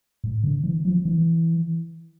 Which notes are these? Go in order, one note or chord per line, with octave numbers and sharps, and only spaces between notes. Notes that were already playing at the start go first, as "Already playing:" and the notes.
A2
D3
E3
F3
E3